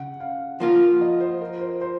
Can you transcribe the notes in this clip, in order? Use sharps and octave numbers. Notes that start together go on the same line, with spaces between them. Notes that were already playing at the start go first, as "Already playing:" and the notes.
Already playing: C#3 F#5
F5
F3 A#3 F4
D#5
C5
A#4
C5
C5